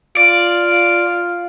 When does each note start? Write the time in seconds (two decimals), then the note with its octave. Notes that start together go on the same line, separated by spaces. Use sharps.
0.17 F4 D5